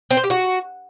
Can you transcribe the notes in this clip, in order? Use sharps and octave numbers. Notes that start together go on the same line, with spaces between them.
C4
C5
G4
F#4